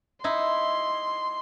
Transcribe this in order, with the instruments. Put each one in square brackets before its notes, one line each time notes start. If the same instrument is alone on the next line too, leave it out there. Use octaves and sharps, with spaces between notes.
[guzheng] D#4 E4 [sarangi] C6